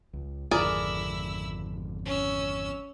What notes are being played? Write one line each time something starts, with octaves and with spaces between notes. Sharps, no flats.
C#2
G#1 F2 D3 E4 G#4 A#4 D5 E6
C#4 E6